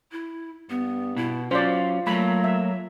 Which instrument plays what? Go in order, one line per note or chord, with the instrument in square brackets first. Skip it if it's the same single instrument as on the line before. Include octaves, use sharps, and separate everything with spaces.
[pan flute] E4
[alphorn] G2 [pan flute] B3
[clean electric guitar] B2 [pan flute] E4
[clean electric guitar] F#3 C#4 [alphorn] F4 [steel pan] C5 D5 [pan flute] F5
[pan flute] F#3 [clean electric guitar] A3 A#3 [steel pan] B5
[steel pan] E5